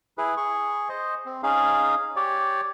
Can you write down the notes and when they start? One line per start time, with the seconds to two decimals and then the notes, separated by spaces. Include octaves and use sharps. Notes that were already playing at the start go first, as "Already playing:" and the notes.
0.18 E4 G#4 B4
0.37 G#4 C#6
0.89 C5 D#5
1.26 C4
1.43 C#4 D#4 G#4 F5
2.16 G4 C#5 D5